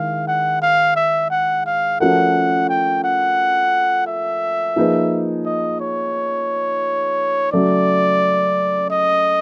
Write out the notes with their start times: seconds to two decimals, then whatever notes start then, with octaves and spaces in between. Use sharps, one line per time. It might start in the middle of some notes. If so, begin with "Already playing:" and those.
Already playing: D#3 G#3 E4 F5
0.28 F#5
0.62 F5
0.96 E5
1.31 F#5
1.66 F5
2.00 F3 A3 C#4 F#4 A#4 F#5
2.69 G5
3.04 F#5
4.07 E5
4.76 F3 A#3 D#4 G#4 B4
5.46 D#5
5.80 C#5
7.52 C#3 F#3 A3 D5
8.91 D#5